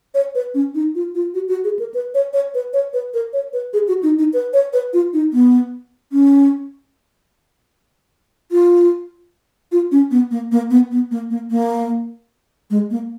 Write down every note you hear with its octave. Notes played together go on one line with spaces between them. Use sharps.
C#5
B4
C#4
D#4
F4
F4
F#4
F#4
G#4
A#4
B4
C#5
C#5
B4
C#5
B4
A#4
C#5
B4
G#4
F#4
D#4
D#4
B4
C#5
B4
F4
D#4
B3
C#4
F4
F4
C#4
B3
A#3
A#3
B3
B3
A#3
A#3
A#3
G#3
A#3